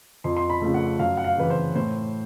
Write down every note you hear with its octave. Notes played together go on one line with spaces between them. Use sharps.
F2 C6
C6
B5
C#3 F3 A3
F#5
F#2 F5
F#5
F5
C#3 E3 B4
C5
A2 C5